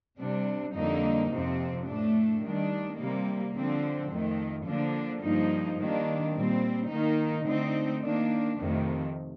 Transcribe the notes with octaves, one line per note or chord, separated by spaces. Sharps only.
C3 G3 D4
F2 D3 G3 A#3 D#4
F2 C3 F3 C4
A2 A3 D4
D#3 G3 D4
C3 G3 A#3
D3 F3 C4
F2 D#3 A3
D3 F3 A#3 D4
G2 F3 A#3 D#4
D#3 G3 A#3 D4
A#2 G3 C4
D#3 A#3 D#4
D3 A3 C4 D#4
D#3 A#3 D4
F2 C3 D#3 A3